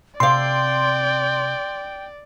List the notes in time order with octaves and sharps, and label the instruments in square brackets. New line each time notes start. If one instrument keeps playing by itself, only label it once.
[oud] C3 F5 [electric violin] D5 [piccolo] G5 [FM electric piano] C6